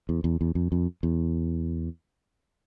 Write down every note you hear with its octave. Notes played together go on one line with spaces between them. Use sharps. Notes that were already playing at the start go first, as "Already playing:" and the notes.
E2
E2
E2
F2
F2
E2